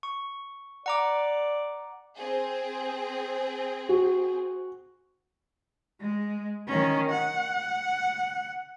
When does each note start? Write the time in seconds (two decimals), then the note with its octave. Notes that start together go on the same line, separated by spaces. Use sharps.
0.03 C#6
0.86 D5 F#5 A#5 D6
2.18 C4 G#4
3.89 F#4
6.00 G#3
6.67 D#3 C#4
7.11 F#5